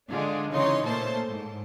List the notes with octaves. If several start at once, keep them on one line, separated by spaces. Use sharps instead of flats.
D3 G#3 D4 F4 G#4
C#3 E3 D#4 C#5 C6
A#2 A3 A#3 C5 A5
G#2